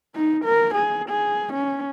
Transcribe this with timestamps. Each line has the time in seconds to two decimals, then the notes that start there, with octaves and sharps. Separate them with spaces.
0.15 D#4
0.45 A#4
0.75 G#4
1.09 G#4
1.53 C#4